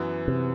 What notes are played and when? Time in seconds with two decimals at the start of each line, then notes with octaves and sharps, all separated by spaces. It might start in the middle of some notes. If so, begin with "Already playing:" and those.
Already playing: F#2 E3 B3
0.28 C3